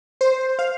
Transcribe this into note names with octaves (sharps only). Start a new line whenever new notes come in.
C5
F5